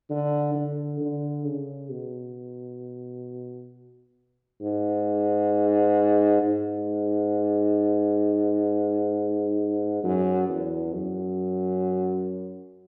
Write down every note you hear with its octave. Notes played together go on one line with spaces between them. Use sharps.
D3
D3
D3
C#3
B2
G#2
G#2
F#2
E2
F#2